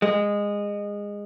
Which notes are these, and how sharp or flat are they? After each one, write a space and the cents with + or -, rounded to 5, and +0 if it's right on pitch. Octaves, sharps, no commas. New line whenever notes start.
G#3 -20